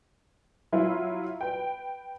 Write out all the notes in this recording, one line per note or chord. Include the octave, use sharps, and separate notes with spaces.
F#3 E4 F4
B4 G5